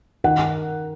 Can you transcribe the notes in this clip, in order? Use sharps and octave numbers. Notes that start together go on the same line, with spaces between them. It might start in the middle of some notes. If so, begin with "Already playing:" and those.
D#3 F#5